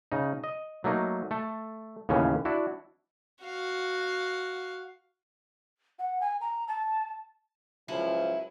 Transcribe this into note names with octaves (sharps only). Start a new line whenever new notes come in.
C#3 D#4
D#5
F#3 A3 A#3 D#4
A3 A4
D#2 A2 C#3 E3 C#4
D4 E4 F#4
F#4 F5
F#5
G#5
A#5
A5
C#2 F3 F#3 C#4 E4